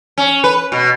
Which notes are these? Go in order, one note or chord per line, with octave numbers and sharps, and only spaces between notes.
C#4
B4
B2